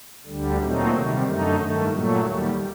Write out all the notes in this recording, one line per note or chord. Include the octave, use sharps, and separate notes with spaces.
D2 D3 G3
A#2 F#3 A3 C4 D#4
C3 D#3 G3
F#2 D3 A3 D#4
G2 D#3 A3
A#2 F#3 A3
D#2 D#3 G3